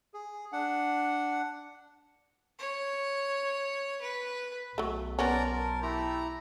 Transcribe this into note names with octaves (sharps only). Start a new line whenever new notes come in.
G#4
D4 F#5
C#5
B4
B1 F#3 A3
B3 C#4 A#4 C5 D5 A5 A#5
A#4
A3 E4 G4 A#5